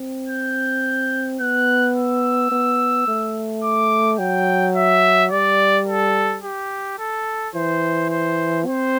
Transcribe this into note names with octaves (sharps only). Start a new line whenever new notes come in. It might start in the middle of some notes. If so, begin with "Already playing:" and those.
Already playing: C4
G6
B3 F#6
E6
B3
A3
D6
F#3 G5
E5
G3 D5
A4
G4
A4
E3 C5
C5
C4 C5